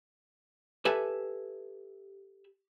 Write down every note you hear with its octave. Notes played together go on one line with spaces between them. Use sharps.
G4 A4 B4 E5 G#5